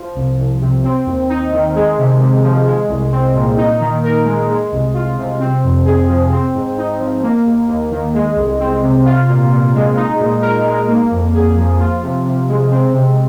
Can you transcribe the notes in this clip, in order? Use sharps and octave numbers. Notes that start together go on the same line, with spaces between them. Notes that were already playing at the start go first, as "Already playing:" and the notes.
Already playing: F3
C2
C2
C3
C4
D#2
D#4
D#3
G#3
C3
C3
F3
G#3
C2
C4
A#2
D#4
D#3
A#4
G#3
G#3
C2
F4
C3
C4
F2
G#4
F3
C4
G#2
D#4
F3
A#3
D#2
D#2
D#3
G#3
C2
C4
C3
F4
A#2
A#2
G#3
D#4
A#2
A#4
G#3
A#3
F2
G#4
F3
F4
C3
C3
G#3
C4
C3